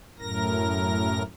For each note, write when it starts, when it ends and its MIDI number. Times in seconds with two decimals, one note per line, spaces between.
0.19 1.22 42
0.19 1.22 45
0.19 1.22 70
0.19 1.22 94